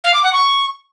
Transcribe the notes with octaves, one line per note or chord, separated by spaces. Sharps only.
F5
D6
F#5
C#6